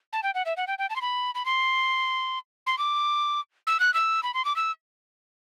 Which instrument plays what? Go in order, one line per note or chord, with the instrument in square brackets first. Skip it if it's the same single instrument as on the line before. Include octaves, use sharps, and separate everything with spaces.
[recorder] A5
G5
F#5
E5
F#5
G5
G5
A5
C6
B5
B5
C6
C6
D6
E6
F#6
E6
B5
C6
D6
E6